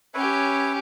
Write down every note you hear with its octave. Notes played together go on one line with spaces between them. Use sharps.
C#4 G4 B4 C#5 E5